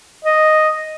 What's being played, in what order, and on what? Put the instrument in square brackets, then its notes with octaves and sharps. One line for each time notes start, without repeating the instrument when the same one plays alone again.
[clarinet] D#5